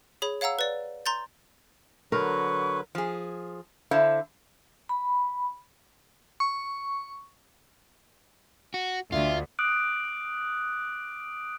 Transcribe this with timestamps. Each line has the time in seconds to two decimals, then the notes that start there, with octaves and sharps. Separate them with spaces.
0.22 G#4 C#5 B5
0.41 C#5 F5 F#5 A#5 E6
0.59 B4 D5
1.06 A#5 C6 G6 A6
2.12 D3 F#3 A#4 B4 C#6
2.95 F3 G#4
3.91 D3 E4 C5 E5 F5 A5
4.89 B5
6.40 C#6
8.74 F#4
9.12 D2 F4 E5
9.59 D6 D#6 F6 F#6 D7